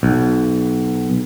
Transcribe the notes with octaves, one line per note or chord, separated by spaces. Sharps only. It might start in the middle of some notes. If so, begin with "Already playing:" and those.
B1